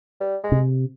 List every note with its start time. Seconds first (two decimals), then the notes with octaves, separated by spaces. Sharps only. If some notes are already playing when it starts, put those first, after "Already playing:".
0.20 G3
0.44 G#3
0.52 C3